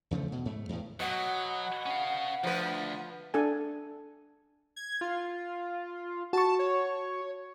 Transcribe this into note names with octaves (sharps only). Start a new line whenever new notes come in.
E2 C#3 F3 A3
B2
G#2 A3
E2 A2
B2 F#3 F#5
C#4 F5
D2 F3 B4
D4 A4 G#5
G#6
F4
F#4 A5 C#6
C#5